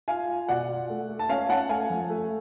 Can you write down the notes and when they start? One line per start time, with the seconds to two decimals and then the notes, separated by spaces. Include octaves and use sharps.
0.08 F4 F5 G#5
0.29 F4
0.48 B2 D5 F#5
0.68 F4
0.90 A3
1.09 A3
1.19 A5
1.29 C#4 F5 G#5
1.49 C#4 F#5 A5
1.69 A3 F5 G#5
1.90 F3
2.10 A3